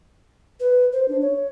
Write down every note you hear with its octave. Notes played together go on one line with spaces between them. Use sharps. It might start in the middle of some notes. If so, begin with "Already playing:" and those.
B4
C5
D4
C#5